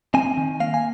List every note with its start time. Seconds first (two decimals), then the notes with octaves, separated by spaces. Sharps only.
0.14 C4 G#5
0.37 D#3
0.60 A#3 F5
0.74 G#5